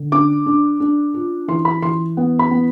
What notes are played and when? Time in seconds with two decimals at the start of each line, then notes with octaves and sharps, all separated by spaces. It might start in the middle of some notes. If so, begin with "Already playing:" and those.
Already playing: D3
0.12 D4 D6
0.46 D4
0.80 D4
1.14 F4
1.48 E3 C6
1.65 B5
1.82 E3 C6
2.17 B3
2.39 B5
2.51 B3